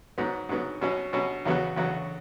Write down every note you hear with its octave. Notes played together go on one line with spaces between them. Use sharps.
G#2 F#3 B3
G#2 F#3 B3
B2 F#3 C#4
B2 F#3 C#4
E2 C#3 F#3 B3 F#4
E2 C#3 F#3 B3 F#4